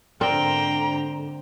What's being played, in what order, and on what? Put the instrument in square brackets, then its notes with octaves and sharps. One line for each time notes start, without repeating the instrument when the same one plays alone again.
[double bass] G#2 D3 [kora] C4 A#4 D5 [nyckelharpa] C5 G5 [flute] A#5